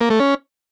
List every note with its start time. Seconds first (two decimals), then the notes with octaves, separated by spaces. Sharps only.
0.01 A#3
0.10 A3
0.20 C#4